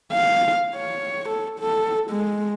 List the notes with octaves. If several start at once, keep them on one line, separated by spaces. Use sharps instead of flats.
F5
C#5
A4
A4
G#3